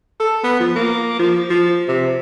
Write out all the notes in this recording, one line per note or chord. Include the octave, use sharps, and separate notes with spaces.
A4
B3
F3
A#3
F3
F3
C3